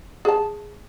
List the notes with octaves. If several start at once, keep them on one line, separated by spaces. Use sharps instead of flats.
G#4 A5